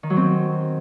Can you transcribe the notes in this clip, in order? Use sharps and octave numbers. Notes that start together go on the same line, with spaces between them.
D#3
F#3
C4